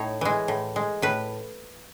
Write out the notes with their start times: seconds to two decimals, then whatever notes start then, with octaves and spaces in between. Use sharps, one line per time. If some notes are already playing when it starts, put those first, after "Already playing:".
Already playing: A2 D#4 C#5
0.21 E3 G#3
0.48 A2
0.76 G#3
1.02 A2 B4